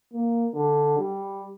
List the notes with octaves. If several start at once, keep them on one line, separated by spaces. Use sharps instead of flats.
A#3
D3
G3